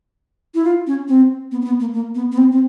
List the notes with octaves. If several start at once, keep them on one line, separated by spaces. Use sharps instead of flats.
E4
F4
C#4
C4
B3
C4
B3
A#3
A#3
B3
B3
C4
C4